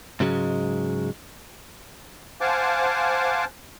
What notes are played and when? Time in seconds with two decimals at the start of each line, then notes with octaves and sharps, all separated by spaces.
0.20 G#2 C#3 F#3 G#3
2.41 C5 F5 F#5 G#5 A5 D6